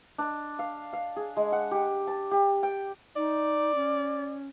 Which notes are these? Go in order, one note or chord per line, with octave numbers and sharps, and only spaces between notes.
D4
F5
F5
G#4
G#3
F#5
G4
A5
G4
G5
D#4 D5
C#4